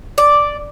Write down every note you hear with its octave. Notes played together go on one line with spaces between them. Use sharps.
D5